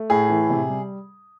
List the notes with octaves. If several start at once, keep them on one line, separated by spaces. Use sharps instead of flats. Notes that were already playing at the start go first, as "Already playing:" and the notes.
Already playing: A3
A2 G#4
E3
C3
G3